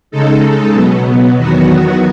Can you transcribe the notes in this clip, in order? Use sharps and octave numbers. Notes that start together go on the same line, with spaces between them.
C#3 G#3 D#4 A4
B2 F#3 B3
E2 D#3 F#3 B3 F#4